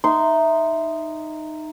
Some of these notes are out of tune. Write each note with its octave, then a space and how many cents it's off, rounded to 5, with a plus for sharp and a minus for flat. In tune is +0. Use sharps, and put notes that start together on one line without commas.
D#4 -10 E5 +0 C6 -20